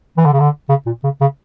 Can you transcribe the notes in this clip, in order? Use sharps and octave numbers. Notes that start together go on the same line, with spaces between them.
E3
D3
C#3
D3
C#3
A#2
C#3
C#3